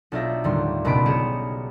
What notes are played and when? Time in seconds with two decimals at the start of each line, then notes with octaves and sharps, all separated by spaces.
0.12 B1 D4 F4 G4 E5 A#6
0.44 D#2 A2 D3 G3 C6
0.85 G#1 C#2 B2 B5 C6 D7
1.06 B1 G4 G#4 C#7 E7